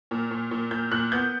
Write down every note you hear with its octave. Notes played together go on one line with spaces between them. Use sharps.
A#2
A#2
A#2
A#2 G6
A#2 F#6
B3 G6